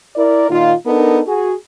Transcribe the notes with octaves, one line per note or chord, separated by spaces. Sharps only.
E4 A#4 D5
A#2 D#3 D#4 F4
B3 D4 D#4 A4 A#4
F#4 G#4